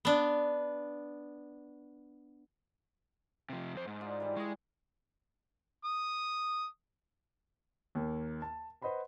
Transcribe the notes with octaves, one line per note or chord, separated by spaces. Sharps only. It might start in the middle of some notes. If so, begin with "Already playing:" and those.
B3 D4
C3 F3
F2 C5
G#2
D#4 F4 D5
E3 G3
G#3 D#5 C#6
D#6
D#2 A#3
A5
B4 C5 D#5 F#5 B5 C6